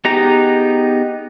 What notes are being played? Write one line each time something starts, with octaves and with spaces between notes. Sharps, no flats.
B3 D#4 G4 G#4 A#5